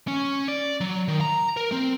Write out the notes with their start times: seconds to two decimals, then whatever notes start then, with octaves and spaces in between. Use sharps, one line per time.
0.08 C#4
0.48 D5
0.81 F#3
1.08 D#3
1.21 A#5
1.57 A#4
1.72 C4